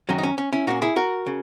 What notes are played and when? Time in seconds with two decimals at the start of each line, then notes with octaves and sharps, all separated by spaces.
0.09 F#2 D#3 F#3 C#4
0.18 D#4
0.23 C#4
0.38 C#4
0.53 C#4 E4
0.67 A#2 A#3 C#4 D#4 F#4
0.82 E4 G#4
0.96 F#4 A#4
1.27 C#3